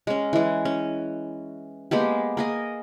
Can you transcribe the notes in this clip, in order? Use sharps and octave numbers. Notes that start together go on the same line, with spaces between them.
G#3 C#4
E3 G#3
C#4
G#3 A#3 B3 G4
A#3 G#4 D#5